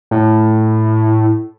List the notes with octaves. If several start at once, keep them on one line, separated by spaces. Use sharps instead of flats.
A2